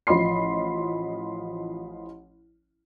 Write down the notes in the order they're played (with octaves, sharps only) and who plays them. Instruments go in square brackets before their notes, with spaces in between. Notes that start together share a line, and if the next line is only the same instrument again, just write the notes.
[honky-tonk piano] A1 F3 D#5 B5 C6 C7